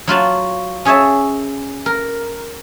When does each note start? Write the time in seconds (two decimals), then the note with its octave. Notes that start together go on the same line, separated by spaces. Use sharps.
0.07 F#3 F4 F#4 A5
0.85 C#4 G#4 C#5 E5 A5
1.86 A#4